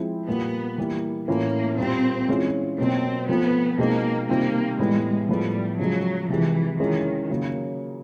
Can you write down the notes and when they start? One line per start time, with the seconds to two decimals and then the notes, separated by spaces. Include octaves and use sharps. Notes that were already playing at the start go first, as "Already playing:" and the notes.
Already playing: F3 G#3 C4 E4
0.27 A#2 G3 A#3 B3
0.78 E3 G3 A#3
1.28 A2 E3 A3 A#3 C#4 F4
1.78 A#2 G3 A#3 C4
2.29 E3 G#3 C#4 F4
2.78 B2 F#3 A#3 C4
3.29 F3 A3 B3 C4 F4
3.78 B2 G#3 A#3 C4 D#4
4.28 C3 D#3 G3 A#3 C4 F4
4.79 A2 E3 G3 G#3 B3
5.29 A2 F3 G3 G#3 B3
5.79 C#3 F3 F#3 G#3
6.30 C3 E3 F3 G#3
6.80 D#3 E3 G#3 C#4 F4
7.30 C#3 F#3 A#3